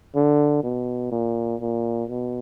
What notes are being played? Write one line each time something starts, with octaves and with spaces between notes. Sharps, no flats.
D3
B2
A#2
A#2
B2